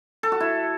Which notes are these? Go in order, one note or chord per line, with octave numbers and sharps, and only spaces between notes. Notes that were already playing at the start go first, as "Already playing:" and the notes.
A4
F#4
E4